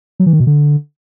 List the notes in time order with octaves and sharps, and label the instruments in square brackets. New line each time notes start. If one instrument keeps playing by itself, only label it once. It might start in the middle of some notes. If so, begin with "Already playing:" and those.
[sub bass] F#3
E3
D#3
B2
D3